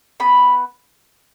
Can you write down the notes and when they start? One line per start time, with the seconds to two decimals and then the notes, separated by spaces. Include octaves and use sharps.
0.20 B3 B5